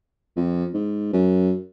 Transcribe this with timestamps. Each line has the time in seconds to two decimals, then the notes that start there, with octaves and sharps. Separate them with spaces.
0.36 F2
0.74 G#2
1.13 F#2